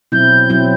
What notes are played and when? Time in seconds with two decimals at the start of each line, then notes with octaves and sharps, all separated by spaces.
0.12 B2 F#3 C4 E4 G6
0.50 B2 F#3 C4 E4